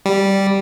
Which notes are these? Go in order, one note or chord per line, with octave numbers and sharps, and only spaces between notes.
G3